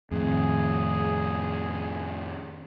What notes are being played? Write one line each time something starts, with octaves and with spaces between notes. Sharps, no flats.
F2 A2 D#3 C4 G#4